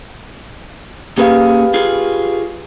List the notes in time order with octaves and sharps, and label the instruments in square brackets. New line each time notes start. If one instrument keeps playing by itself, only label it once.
[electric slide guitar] A#3 C#4 G#4 [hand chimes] G4 B4 F5
[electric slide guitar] F4 G#4